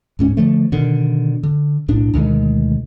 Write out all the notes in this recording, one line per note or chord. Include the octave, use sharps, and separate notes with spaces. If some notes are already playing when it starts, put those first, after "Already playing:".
D1 G#2 C#4
D3 F3 A3
B2 D3 D#3
D3
B1 A2 D4
D2 B2 D#3 G#3